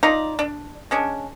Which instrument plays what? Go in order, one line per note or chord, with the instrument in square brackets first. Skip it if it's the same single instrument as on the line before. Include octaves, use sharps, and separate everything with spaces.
[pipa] D#4 F4 D5 A#5
D4
G#3 C#4 D4